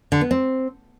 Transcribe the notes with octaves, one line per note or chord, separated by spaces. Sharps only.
D3
B3
C4